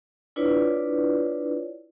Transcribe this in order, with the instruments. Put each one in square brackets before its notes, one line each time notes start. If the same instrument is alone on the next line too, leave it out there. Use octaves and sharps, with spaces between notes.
[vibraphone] D4 E4 F4 B4 C#5 D5